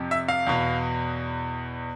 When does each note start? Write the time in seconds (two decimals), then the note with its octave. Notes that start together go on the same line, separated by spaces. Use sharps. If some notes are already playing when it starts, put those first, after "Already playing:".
Already playing: F2 C3 F3
0.11 E5
0.28 F5
0.47 E2 B2